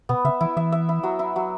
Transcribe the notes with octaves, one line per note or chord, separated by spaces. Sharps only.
B2 B3
C#3 E5
E3 E4
E3 E5
E5
E4
F#3
E4
F#3